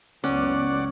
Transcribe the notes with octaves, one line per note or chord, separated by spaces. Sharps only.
F#1 C#2 B3 C#4 D5 F#5